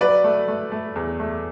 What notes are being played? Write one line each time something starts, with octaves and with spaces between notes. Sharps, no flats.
F#3 B4 D5
A3
A3
A3
E2
A3